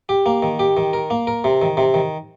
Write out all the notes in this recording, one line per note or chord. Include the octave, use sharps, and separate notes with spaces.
G4
A#3
D#3
G4
D#3
A#4
A#3
A#4
C3
D#3
C3
D#3